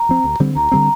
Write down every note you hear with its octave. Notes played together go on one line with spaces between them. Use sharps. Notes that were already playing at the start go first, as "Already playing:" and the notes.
Already playing: A#5
F3 C4
D2
D3 G3 C4
D2 A#5
D3 G3 C4